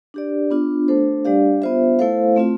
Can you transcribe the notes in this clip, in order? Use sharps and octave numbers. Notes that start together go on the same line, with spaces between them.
D4 G4 D5
B3 D4 F4
A3 D4 A4 C5
G3 D4 G4 D5 F5
B3 F4 C5 E5
A3 E4 A4 C5 F5
A3 C4 F4